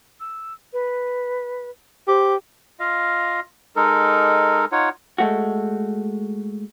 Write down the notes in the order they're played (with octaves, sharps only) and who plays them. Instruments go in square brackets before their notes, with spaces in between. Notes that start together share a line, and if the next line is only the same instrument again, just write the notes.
[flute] E6
B4
[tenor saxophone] G4 [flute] C5
[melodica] F4 D#5 F5
G#3 D#4 A4 A#4
D#4 F4 C#5 F#5
[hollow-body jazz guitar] G#3 A3 F#4